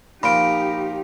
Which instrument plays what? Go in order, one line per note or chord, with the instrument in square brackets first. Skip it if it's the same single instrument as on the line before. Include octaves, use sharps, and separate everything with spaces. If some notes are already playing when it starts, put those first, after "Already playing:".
[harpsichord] A#2 F3 [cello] D#4 G4 [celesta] B5 D7